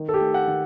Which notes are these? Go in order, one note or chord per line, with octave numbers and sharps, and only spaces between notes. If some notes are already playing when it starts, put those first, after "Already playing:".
Already playing: D#3
A4
G4
A3
F#5
D#3